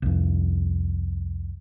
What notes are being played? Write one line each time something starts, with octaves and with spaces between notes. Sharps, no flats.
C2 F2